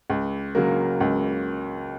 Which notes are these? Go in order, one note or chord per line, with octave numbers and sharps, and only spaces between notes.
C#2
C#3 F#3 A#3
C#2